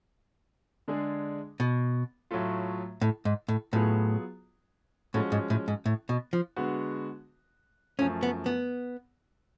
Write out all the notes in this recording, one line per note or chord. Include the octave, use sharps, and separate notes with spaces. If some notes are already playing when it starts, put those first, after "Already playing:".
D3 G#3 D4 G#4
B2
A2 F#3 A3 F4
A2
G#2
A2
A2 F#3 B3 F4 G#4
A2 F3 G#3 C#4 F#4
G#2
A2
G#2
A2
B2
F3
D3 G#3 B3 F#4
F#2 F3 A3 C#4
B3
B3